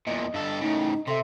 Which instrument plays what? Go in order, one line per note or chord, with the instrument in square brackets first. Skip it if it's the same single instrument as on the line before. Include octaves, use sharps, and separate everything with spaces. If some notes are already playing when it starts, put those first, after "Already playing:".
[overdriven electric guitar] E2 A#2 [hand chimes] D#5
[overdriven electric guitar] G2 A4
[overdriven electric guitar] A2 C#3 [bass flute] D#4
[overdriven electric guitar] C3 [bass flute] A4 [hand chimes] E5 C6